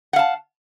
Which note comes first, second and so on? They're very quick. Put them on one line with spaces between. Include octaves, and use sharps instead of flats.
F#5 F5 A5